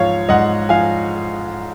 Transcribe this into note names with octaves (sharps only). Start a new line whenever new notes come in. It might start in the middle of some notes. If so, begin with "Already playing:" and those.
Already playing: G#2 F3 C#5 F5
G#2 D#5 F#5
F3 F5 G#5